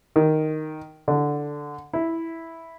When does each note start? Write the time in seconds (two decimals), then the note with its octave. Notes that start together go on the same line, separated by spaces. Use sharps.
0.16 D#3
1.08 D3
1.93 E4